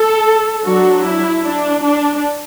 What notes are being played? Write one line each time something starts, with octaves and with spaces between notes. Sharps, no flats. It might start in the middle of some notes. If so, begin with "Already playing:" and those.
Already playing: A4
F#3 D4 F#4
E4
D4
D4